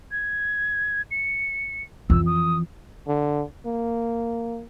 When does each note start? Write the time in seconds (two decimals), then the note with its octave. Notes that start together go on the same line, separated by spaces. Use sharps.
0.11 G#6
1.11 C#7
2.10 F2 E3 E6
2.26 D#6
3.08 D3
3.66 A#3